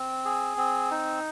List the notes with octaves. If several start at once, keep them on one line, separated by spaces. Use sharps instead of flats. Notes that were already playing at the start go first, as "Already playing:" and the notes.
Already playing: C4
G#4
C4
D#4